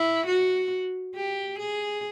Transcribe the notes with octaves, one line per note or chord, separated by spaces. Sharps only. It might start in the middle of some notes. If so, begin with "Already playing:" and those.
Already playing: E4
F#4
G4
G#4